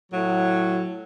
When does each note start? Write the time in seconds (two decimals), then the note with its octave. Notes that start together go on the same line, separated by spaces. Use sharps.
0.12 A2 F#3